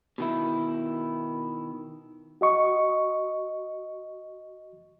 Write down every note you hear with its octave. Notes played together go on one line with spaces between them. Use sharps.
B2 D#3 E4
F#4 D#5 C#6